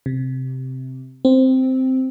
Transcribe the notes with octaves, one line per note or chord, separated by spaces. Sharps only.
C3
C4